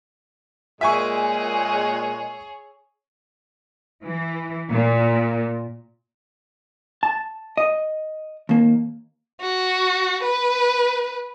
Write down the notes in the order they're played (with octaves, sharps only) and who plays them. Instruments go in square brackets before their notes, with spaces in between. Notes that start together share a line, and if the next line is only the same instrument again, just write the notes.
[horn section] A#2 G#3 [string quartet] G#4 C#5 [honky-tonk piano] E5 G#5 C#6
[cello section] E3
A#2
[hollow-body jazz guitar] A5
D#5
D#2 A#3
[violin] F#4
B4